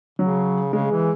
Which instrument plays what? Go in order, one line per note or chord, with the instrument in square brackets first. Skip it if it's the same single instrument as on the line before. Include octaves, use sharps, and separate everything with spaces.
[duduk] C#3 [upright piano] F#3
[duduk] C#3 [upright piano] G#3
[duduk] E3